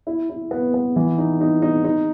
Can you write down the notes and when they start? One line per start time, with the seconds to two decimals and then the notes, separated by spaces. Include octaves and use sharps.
0.07 E4
0.30 E4
0.51 B3
0.74 B3
0.96 E3
1.18 D#4
1.41 D#4
1.62 D#4
1.84 D#4